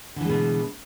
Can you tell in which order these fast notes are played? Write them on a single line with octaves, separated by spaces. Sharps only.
D3 E3 G#3 B2